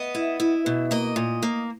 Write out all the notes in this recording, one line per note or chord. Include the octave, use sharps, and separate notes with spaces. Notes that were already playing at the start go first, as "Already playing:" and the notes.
Already playing: B3 D#5
E4
E4
B2
A#3 D#5
A#2
A#3